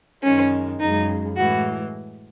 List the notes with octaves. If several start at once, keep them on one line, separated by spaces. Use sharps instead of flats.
F#2 D#3 G#3 C#4
F#2 C#3 G#3 D#4
A2 E3 G#3 F#4